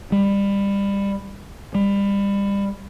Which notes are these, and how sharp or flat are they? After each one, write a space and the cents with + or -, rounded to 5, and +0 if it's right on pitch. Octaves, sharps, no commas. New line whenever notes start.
G3 +25
G3 +30